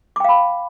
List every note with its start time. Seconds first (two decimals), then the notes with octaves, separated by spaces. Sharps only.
0.16 D6
0.20 G5
0.24 F5
0.29 B5